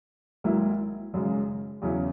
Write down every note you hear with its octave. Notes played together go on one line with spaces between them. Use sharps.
G#1 G#2 F#3 A#3 E4
G#1 F#2 C#3 G#3
E2 C#3 F#3 C#4 E4